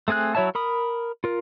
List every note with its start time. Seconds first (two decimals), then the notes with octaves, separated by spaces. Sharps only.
0.08 A3 C4 G#4 G#5 F#6
0.35 F#3 E4 C#5 E5 A5
0.55 A#4 B5 D#6
1.24 F4 A#4